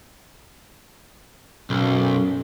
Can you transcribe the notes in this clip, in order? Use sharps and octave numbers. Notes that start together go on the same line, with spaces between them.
B1 F#2